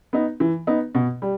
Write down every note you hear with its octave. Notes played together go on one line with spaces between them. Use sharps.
B3 D#4
E3
B3 D#4
B2
G3